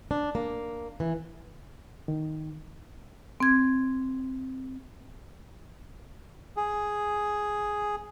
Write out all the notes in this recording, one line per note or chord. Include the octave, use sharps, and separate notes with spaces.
D4
A#3
E3
D#3
C4 G#6
G#4